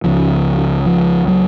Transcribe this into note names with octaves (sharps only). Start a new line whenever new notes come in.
C#2 C#3 F3
F3
F#3